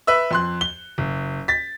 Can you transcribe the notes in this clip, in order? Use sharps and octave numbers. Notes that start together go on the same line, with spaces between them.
B4 E5 E6
F2 C6 F#6
G7
F#1
A6 B6